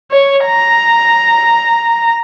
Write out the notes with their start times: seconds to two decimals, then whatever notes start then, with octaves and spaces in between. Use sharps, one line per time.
0.12 C#5
0.46 A#5